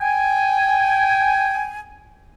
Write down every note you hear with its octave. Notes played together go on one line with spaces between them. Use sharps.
G5 G#5